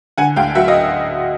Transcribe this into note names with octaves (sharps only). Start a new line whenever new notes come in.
D3 F#5 G#5
D2 F5 G5
F#3 E5 F#5
D#5 F5